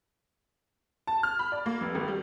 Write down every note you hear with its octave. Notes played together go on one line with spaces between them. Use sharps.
A5
F6
B5
D5
A#3
F1
G#1
G3